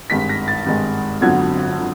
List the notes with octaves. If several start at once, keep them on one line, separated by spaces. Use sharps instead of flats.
G#1 G2 D#3 G#3 B6
A#6
A6
G#1 G2 D#3 G#3
G1 F2 D3 F#3 G#6
D3